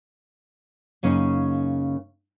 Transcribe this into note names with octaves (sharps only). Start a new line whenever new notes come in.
F#2 C#3 A#3 C#4 D#4